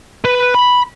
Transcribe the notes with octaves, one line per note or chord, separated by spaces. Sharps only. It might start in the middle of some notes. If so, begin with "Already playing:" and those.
B4
B5